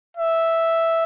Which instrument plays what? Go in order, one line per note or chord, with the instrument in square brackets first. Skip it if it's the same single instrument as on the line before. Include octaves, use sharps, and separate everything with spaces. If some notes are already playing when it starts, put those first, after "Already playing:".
[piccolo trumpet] E5